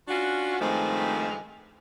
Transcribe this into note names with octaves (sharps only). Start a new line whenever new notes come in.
C#4 D4 F4 F#4
G2 D#3 F3 G#3 A3 C4